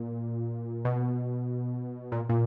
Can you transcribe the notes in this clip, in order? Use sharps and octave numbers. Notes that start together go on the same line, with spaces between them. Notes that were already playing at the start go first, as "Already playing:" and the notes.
Already playing: A#2
B2
A#2
A#2